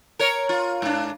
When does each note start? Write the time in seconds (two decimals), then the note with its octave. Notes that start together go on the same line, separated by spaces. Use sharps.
0.19 A#4 C#5
0.49 F4
0.82 G#2 D4